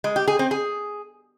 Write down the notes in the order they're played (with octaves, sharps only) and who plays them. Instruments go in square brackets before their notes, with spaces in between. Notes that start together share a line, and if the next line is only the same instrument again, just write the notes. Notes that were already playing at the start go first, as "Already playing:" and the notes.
[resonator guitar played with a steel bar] G#3
G4
G#4
C4
G#4